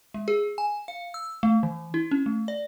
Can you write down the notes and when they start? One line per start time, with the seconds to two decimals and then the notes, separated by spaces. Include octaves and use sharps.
0.14 G#3
0.28 G#4
0.58 G#5
0.88 F5
1.14 E6
1.43 A3
1.63 E3
1.94 E4
2.11 C#4
2.26 A3
2.48 D5